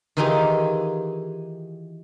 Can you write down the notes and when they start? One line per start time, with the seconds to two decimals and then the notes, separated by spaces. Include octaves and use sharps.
0.17 D#3 E3 D#4 F4 G4 G#4